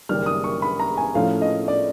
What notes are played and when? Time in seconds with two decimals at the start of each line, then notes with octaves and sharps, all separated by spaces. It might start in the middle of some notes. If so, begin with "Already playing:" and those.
0.09 F#1 F#2 D#3 G3 F6
0.26 D#6
0.44 C#6
0.62 B5
0.80 A#5
0.97 G#5
1.15 A2 F3 A3 C#4 F5
1.42 D#5
1.68 D5